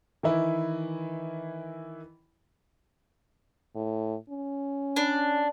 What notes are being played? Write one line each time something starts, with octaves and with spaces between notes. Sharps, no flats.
D#3 E3 E4
A2
C#4
D4